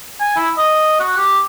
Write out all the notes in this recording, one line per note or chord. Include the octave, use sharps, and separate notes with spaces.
G#5
E4
D#5
F#4
G4